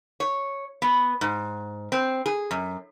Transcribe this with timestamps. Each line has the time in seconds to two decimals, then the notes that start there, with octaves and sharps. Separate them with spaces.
0.20 C#5
0.82 B3
1.21 G#2
1.92 C4
2.26 G#4
2.51 F#2